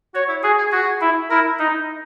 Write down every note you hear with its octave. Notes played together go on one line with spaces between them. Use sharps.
F#4 C#5
E4
F#4 G#4
G#4
F#4 G#4
E4
E4 A#4
D#4